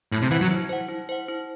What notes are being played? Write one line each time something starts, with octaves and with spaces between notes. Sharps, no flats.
A2 E4
C3
E3 C5 F#5
F#3
E4
C5 F#5
E4
C5 F#5
E4